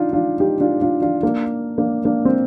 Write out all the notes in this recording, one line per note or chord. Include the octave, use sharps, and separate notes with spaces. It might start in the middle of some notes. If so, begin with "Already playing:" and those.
Already playing: D4 D#4 F4
D4 F4
D#4 G4
D4 F4
D4 F4
D4 F4
A#3 D4
A#3 D4
A#3 D4
C4